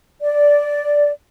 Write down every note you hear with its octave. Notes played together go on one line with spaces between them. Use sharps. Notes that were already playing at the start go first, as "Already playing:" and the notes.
D5